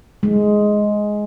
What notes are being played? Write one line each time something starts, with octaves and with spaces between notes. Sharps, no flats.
G#3